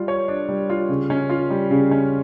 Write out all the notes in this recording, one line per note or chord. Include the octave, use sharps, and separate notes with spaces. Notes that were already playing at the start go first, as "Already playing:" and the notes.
Already playing: G3 F4
C#5
D4
G3
F4
C#3
C#4
F4
G3
C#3
C#4